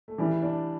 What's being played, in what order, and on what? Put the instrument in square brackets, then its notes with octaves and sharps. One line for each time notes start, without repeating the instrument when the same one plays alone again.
[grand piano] A3
[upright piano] E3 [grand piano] G3
[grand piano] D4